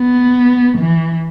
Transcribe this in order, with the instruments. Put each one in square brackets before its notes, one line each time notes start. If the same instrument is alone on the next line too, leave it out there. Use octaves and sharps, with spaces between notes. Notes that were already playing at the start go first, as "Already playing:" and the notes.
Already playing: [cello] B3
E3